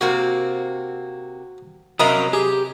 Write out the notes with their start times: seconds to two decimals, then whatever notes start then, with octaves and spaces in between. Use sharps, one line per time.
0.01 C3 A#3 C4 F#4
1.99 C3 F#3 A#4 D#5 F5 A#5 B5 D#6
2.33 G4 G#4